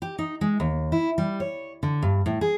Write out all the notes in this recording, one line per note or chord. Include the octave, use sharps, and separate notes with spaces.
G4
D#4
G#3
D#2
E4
G3
C#5
D3
G2
A2
G#4